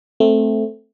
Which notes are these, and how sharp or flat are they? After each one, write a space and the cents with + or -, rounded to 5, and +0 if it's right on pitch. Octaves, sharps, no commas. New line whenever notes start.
A3 +0 C4 +0